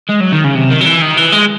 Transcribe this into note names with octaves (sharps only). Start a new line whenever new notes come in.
G#3
F#3
D#3
C#3
C3
D#3
F#3
E3
D#3
E3
G#3